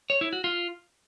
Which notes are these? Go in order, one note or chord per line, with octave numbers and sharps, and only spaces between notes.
C#5
E4
F#4
F4